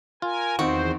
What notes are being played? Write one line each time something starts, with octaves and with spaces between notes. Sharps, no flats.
F4 A#4 G#5
E2 D#3 C4 F#4 C5